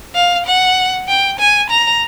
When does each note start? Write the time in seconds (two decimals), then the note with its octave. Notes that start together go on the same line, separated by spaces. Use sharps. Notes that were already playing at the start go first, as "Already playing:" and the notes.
0.15 F5
0.46 F#5
1.08 G5
1.39 G#5
1.70 A#5